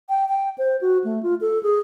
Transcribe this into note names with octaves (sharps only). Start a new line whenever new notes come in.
G5
G5
C5
F#4
A3
F4
A4
G#4